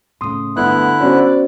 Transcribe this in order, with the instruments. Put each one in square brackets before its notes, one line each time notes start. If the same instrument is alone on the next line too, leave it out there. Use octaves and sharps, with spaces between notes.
[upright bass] A2 C#3 [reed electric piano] C6 D#6
[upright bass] G1 A3 [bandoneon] D3 E4 F#6 [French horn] B3
[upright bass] B3 [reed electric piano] C#4 F#4 C5 [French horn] D5